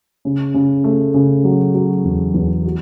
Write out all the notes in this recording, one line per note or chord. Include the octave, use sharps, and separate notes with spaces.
C#3
C#3
A3
C#3
F#3
F#3
E2
E2
F#4